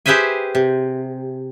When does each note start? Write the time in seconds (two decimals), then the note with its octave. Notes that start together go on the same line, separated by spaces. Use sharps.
0.06 G4 G#4 B4 C5 E5 G#5
0.55 C3